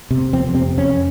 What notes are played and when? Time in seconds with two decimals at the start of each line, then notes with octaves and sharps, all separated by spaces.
0.11 C3
0.33 F2 C4
0.55 C3 C4
0.77 F2 C#4